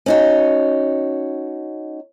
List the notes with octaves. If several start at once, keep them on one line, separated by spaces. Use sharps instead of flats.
C#4 D#4 F#4